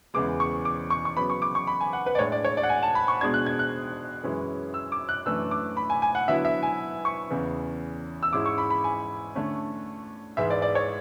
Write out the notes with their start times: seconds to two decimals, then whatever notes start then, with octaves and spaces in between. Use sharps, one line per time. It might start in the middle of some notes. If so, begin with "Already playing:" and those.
0.14 E2 C#3 E3 G#3 D6
0.40 C#6
0.65 D6
0.90 C#6
1.05 C#6
1.17 C#3 F#3 B3 B5
1.30 C#6
1.42 D6
1.55 C#6
1.67 B5
1.80 G#5
1.93 F#5
2.06 B4
2.15 D5
2.19 A2 G#3 D4 C#5
2.32 D5
2.45 C#5
2.57 D5
2.63 F#5
2.69 G#5
2.83 A5
2.95 B5
3.08 C#6
3.21 B2 G#3 D4 G#6
3.34 F#6
3.46 G#6
3.59 F#6
4.23 F#2 E3 G#3 C#4 E4
4.74 E6
4.92 D6
5.09 F#6
5.26 F#2 E3 A3 D4 E6
5.51 D6
5.77 B5
5.90 G#5
6.02 G#5
6.15 F#5
6.28 D3 F#3 B3 E4 E5
6.45 E5
6.63 G#5
7.05 C#6
7.30 E2 C#3 E3
8.23 E6
8.33 G#2 G#3 C#4 E4 D6
8.46 C#6
8.58 B5
8.70 B5
8.84 G#5
9.35 D3 A3 C#4
10.37 G#2 E3 G#3 E5
10.50 D5
10.62 D5
10.75 C#5